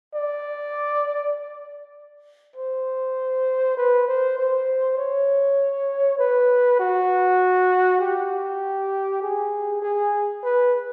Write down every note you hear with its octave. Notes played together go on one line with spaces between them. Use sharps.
D5
C5
B4
C5
C5
C#5
B4
F#4
G4
G#4
G#4
B4